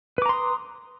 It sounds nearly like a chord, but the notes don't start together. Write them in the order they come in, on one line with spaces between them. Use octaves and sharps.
B4 D6 A#5 C6 D#6